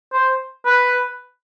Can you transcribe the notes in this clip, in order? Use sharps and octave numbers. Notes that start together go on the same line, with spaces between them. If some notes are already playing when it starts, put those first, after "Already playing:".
C5
B4